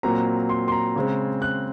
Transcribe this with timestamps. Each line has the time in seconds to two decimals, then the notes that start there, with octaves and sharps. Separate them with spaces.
0.03 A#2 F#3 C4 A#5
0.49 C6
0.68 C6
0.72 A#5
0.96 C#3 G#3 C4
1.42 F#6